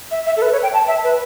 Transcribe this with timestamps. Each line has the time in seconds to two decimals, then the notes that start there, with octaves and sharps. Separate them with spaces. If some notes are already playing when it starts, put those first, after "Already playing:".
0.11 E5
0.26 E5
0.36 A4
0.42 B4
0.52 C#5
0.63 G5
0.73 A5
0.88 E5
1.04 B4